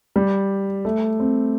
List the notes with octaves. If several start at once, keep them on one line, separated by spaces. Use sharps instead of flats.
G3
A3
C4